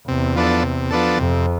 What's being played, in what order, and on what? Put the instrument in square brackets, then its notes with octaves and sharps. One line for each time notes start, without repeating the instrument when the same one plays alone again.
[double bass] E2 [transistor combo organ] C3
[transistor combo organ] F3 B3 D4 A4
C3
F3 B3 D4 A4
[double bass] F2 [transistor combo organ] C3